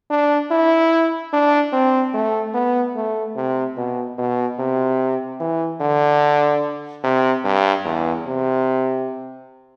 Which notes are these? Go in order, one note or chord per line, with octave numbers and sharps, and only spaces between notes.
D4
E4
D4
C4
A3
B3
A3
C3
B2
B2
C3
E3
D3
C3
G2
E2
C3